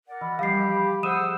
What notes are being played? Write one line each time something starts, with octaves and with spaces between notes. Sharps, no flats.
A#4 D5 F#5
E3 B5
E3 F3 G3 G4 F5 C7
F3 G#4 C5 F#5 D#6 E6 D#7 E7